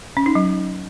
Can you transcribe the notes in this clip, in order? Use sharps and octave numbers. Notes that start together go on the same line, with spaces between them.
C#4
D#4
F#3